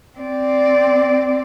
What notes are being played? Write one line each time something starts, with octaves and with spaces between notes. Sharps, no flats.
C4 D5